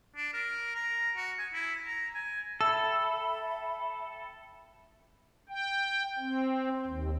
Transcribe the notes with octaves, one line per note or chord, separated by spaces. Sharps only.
D4
A#4
A#5
F#4
G#5
E4
A#5
G#5
A4 E5 G5 B5 E6
G5
C4
D#2